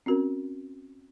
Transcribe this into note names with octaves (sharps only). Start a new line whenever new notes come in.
C4 C#4 F#4 A#4